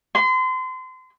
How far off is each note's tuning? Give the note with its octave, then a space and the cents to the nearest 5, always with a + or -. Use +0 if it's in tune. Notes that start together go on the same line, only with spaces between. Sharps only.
C6 -35